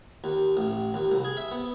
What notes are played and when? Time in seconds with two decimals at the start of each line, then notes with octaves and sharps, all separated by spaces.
0.24 D#2
0.57 A1
0.94 D#2
1.11 C2
1.24 G#4
1.37 E5
1.51 B3